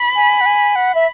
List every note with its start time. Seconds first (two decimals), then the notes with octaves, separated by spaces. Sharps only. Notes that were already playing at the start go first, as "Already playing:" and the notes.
Already playing: B5
0.16 G#5
0.41 F#5
0.46 G#5
0.76 F#5
0.95 E5